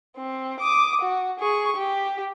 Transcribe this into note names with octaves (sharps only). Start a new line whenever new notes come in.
C4
D6 D#6
F#4
G#4 C#6
G4